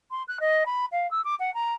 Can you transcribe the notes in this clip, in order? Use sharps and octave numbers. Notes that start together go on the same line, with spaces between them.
C6
F#6
D#5
B5
F5
E6
D6
F#5
A#5